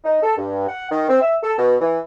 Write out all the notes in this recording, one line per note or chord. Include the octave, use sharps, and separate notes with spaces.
D#4
A4
G2
F#5
D#3
C4
E5
A4
B2
E3